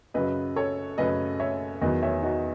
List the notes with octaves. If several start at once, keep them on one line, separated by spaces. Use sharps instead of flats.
F#2 C#3 F#3 B4 D#5
A4 C#5
F#2 C#3 F#3 B4 D#5
C#5 E5
E2 D#3 F#3 B4 D#5
C#5 E5
D#4 F#4